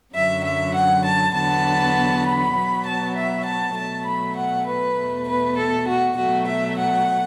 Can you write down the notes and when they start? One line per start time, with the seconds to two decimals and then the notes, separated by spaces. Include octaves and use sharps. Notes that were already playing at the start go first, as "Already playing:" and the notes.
0.14 F#2 D3 F#3 E5
0.44 E5
0.74 F#5
1.05 A5
1.34 E2 D3 F#3 B3 A5
2.25 B5
2.55 B2 F#3 B3
2.86 A5
3.15 E5
3.45 A5
3.75 B2 F#3 A3 A5
4.06 B5
4.36 F#5
4.66 B4
4.97 E2 B2 A3
5.27 B4
5.57 A4
5.87 F#4
6.17 B2 F#3 A3 F#4
6.47 E5
6.77 F#5